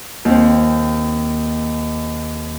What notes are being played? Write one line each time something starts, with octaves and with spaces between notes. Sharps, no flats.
D#2 C4